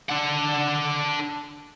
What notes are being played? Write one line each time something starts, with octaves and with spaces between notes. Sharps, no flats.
D4 F#5